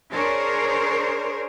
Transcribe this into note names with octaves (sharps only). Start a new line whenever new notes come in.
D4 G#4 A#4 C5 C#5